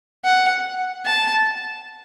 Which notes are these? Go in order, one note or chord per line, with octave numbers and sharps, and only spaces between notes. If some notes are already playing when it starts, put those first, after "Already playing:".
F#5
A5